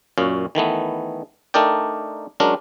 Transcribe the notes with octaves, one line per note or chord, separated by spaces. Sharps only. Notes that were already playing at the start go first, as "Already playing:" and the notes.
F#2 A#2 C#4 F5
D#3 E3 A3 B3
A3 D4 D#4 A#4 D5 G5
F#3 G#3 C#4 D4 A#4